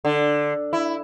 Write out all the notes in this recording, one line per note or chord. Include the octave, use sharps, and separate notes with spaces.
D3
E4